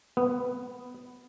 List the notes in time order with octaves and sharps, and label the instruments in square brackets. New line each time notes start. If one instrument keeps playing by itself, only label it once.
[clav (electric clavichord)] B3